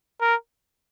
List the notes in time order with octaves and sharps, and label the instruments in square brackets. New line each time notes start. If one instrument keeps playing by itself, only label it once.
[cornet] A#4